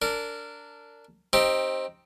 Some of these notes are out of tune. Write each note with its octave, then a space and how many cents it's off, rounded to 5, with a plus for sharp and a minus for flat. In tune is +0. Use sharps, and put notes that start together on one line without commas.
D4 -15 A#4 -25
C4 +15 D#4 +0 G4 +0